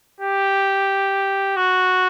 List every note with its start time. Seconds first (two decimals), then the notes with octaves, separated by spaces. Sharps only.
0.21 G4
1.56 F#4